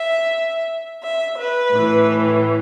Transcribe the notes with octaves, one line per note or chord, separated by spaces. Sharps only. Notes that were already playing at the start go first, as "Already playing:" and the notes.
Already playing: E5
E5
B4
A2
E3